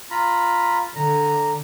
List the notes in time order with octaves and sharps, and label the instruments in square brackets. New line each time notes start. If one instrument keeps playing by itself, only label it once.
[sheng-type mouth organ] F4 A#5 B5
[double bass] D3 [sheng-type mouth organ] A#5